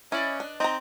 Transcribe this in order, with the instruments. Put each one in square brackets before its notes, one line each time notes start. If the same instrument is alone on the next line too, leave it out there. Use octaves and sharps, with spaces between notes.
[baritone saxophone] C#4 [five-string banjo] E4 [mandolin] B4 D5 D#5
[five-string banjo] D4
[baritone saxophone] C4 [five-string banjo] D#4 A#5